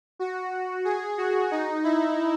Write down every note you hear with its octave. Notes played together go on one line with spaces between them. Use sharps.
F#4
G#4
F#4
D#4
E4